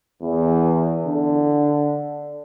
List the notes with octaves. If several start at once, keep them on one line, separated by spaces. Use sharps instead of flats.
E2
D3